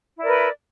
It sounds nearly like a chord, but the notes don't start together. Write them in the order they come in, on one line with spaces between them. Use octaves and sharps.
E4 D5 A#4 B4